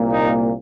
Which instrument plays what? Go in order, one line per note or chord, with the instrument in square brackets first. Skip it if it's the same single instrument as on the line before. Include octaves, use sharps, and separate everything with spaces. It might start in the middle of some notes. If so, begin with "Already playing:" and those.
Already playing: [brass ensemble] C2 A#2 A#3
D#4